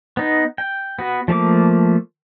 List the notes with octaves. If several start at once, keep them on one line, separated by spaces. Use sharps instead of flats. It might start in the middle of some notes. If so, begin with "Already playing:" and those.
B3 D#4
G5
B3 F#4
F3 A3 A#3 D6